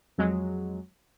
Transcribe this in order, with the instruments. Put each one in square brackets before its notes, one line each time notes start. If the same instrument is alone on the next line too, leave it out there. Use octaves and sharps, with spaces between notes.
[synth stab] F2 F#3 G#3